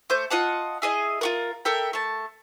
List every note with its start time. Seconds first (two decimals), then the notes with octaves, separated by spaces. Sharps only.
0.10 A3 C5 G6
0.30 F4 D#5 F#5 A5
0.82 E4 G#4 D#5
1.21 F4 F#4 A#4
1.65 A4 A#4 E5 G5
1.93 A3 A5